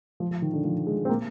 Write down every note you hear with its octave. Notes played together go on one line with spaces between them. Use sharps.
F3
F3
D#3
D3
F3
G#3
C4
A#3